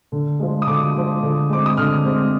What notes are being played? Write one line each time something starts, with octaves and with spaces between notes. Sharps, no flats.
D3
F3 G#3
D#6
D3 D6
F3 G#3
D3
G#3 C4 D6
D#6
D3 F6
G#3 C4